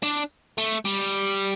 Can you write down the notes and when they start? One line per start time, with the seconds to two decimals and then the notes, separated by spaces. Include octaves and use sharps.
0.03 D4
0.58 A3
0.85 G3